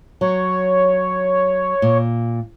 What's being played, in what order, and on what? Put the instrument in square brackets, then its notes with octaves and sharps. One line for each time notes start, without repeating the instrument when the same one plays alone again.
[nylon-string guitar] F#3 [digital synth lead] C#5
[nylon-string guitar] A#2